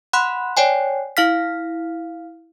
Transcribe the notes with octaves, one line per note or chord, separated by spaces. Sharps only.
F#5 B5 C6 F#6
C#5 D5 G5 G#5
E4 F5 F6 B6